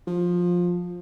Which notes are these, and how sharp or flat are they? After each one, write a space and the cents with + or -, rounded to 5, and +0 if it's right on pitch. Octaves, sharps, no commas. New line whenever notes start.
F3 +15